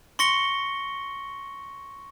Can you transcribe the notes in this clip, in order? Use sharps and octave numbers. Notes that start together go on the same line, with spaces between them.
C6 C#6 A#6 C#7 G7